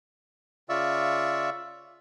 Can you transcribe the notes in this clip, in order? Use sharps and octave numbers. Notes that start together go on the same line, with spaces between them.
C#3 F4 D5 E5 C#6 E6